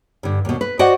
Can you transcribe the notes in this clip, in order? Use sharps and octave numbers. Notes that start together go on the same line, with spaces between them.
G2 D3
D#2 B2
B4
F#4 C5 D5 D#5 F#5